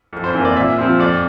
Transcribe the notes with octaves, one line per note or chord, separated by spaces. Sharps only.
F2
C5
E3 A#3 C5
D5
A#2 E5
F3 C4
F2 D5